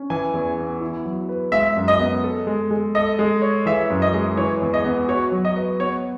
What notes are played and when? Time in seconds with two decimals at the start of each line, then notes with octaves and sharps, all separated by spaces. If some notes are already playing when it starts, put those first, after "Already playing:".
Already playing: C#4
0.10 E3 G#5
0.34 E2
0.58 B3
0.81 E4
1.05 F#3
1.29 B4
1.52 G#3 E5
1.76 F#2
1.88 D#5
2.00 B3
2.24 A4
2.47 G#3
2.71 G#3
2.95 A4 D#5
3.19 G#3
3.42 C#5
3.66 E3 E5
3.90 F#2
4.02 D#5
4.14 G#3
4.37 E3 C#5
4.62 E2
4.74 D#5
4.84 B3
5.08 F#4 C#5
5.32 F#3
5.45 D#5
5.57 B4
5.80 B3 C#5